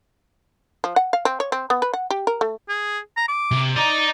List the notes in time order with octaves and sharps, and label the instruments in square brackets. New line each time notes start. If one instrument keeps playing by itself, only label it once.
[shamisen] F3
F#5
F5
C4
C#5
C4
B3
B4
F#5
G4
A#4
A3
[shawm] G#4
A#5
D6
[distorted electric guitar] C3
[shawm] D5 [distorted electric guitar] D#5 A#5